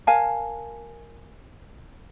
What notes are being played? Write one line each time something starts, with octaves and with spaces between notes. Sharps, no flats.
A#4 F5 G#5 A5